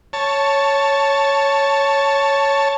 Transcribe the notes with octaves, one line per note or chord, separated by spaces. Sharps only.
C#5 A5